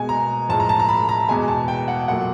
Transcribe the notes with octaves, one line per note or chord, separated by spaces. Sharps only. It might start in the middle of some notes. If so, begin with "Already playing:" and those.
Already playing: B2 G#3 G#5
A#5
A2 F3 G#3 A5
A#5
A5
A#5
B5
A#5
E2 B2 G#3 G#5
A5
G5
F#5
A#2 F#3 A3 F#5